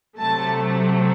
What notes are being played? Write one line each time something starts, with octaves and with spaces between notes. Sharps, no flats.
C3 F#3 A3 A5